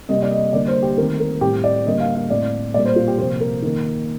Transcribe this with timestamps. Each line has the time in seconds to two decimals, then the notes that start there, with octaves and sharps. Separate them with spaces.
0.09 C3 G3 A#3 D#5
0.22 D5
0.31 D#5
0.53 D3 G3 A#3 D5
0.68 C5
0.82 G4
0.97 D#3 A3 C4 A#4
1.20 A#4
1.41 A2 G3 C4 G4
1.64 D5
1.86 D3 G3 A#3 D#5
2.00 F5
2.15 F5
2.30 A2 A3 C4 D5
2.74 A#2 G3 A#3 D5
2.85 C5
2.96 F4
3.08 G4
3.19 C3 F3 A#3 C5
3.41 A#4
3.62 D#3 A#3